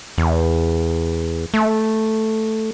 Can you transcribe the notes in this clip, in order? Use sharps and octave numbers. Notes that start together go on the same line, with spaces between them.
E2
A3